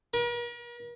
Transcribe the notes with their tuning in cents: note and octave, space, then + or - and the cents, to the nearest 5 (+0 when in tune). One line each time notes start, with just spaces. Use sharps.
A#4 +45